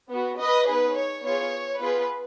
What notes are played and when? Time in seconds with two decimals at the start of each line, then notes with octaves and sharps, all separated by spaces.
0.10 B3 F#4
0.38 B4 D#5
0.67 B3 D#4 G#4 B4
0.95 C#5
1.23 B3 F4 G#4 C#5
1.79 B3 F4 G#4 B4